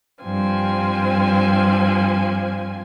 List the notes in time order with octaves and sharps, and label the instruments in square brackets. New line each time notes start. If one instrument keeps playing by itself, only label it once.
[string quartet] G2 F3 C4 G#5